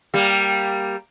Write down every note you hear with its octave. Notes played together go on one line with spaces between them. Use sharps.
G3 A#3